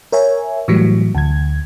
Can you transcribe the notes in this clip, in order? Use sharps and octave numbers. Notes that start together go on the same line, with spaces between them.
A#4 C#5 E5 G#5
A2 E3 F#3 G3
D2 G#6